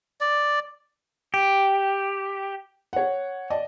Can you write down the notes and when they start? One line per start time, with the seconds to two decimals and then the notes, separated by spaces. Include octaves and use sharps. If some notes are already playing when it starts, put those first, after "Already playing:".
0.21 D5
1.34 G4
2.93 C#5 F#5
3.50 D5 D#5 A5